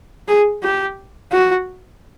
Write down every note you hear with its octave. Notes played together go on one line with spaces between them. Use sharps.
G#4
G4
F#4